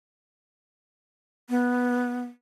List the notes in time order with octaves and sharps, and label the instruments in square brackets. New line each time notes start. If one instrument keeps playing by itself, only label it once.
[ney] B3